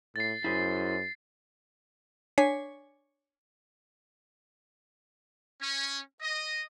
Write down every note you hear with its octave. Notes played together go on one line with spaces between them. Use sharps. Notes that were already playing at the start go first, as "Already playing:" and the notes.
A2 A6 C7
F#2 E4 G#4 C5
D4 C#5 G#5 B6 C7
C#4
D#5